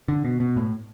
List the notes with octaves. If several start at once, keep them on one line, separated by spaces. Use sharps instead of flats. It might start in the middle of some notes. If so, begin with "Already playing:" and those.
D3
B2
B2
A2